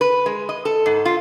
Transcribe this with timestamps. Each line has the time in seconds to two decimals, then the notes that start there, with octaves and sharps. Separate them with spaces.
0.01 B4
0.26 G#3
0.49 D#5
0.65 A4
0.86 G#2
1.05 F4